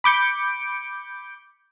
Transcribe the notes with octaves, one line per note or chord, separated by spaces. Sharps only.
B5 D6 G6 C#7 D7